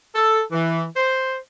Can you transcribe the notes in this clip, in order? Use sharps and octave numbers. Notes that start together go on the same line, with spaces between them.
A4
E3
C5